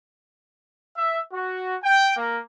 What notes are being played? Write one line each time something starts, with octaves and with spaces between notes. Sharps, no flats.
E5
F#4
G5
A#3